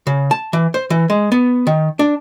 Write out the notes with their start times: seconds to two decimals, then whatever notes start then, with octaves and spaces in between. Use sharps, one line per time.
0.07 C#3
0.31 A5
0.53 E3
0.74 C5
0.90 E3
1.10 G#3
1.32 B3
1.67 D#3
1.99 D4